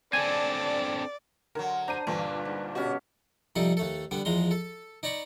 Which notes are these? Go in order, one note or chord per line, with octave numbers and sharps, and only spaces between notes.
C4 D4 A4 D5 G#5
D3 F#3 A#4
D4 C5 A#5 D#7
G1 G2 A#2 E3 C4
B4
G#2
B2 C#4 F#4 G4
C3 F3 G3 D#4 A4
D#2 A3 A4
D3 G3 B3
E2 F3 G#3 A#5 C6
A4
D#4 D5 A#5 B5 C#6